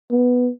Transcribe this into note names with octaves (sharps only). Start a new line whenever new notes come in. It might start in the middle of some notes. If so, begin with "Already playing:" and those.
B3